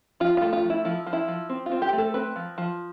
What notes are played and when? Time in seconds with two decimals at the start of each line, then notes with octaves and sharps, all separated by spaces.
0.20 F3 F4
0.37 A3 F4
0.53 F4
0.64 F3
0.70 E4
0.85 F3 E4
1.06 F3
1.13 E4
1.28 F3
1.49 C4
1.66 F4
1.72 C4
1.82 G4
1.93 A3
1.98 A4
2.14 C4 B4
2.36 F3
2.58 F3